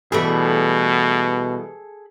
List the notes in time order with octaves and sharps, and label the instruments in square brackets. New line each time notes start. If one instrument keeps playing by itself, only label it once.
[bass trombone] B2 [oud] E3 G3 A3 [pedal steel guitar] G#4 A4 B5